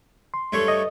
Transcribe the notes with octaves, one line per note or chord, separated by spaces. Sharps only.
C6
G2 A3 C#5
D#5